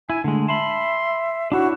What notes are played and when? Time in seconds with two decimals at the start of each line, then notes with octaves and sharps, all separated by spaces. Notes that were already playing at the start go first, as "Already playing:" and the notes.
0.10 E4 G#5
0.24 D3 G#3 A3
0.48 E5 A5 B5 C6
1.52 D4 E4 F#4 C#5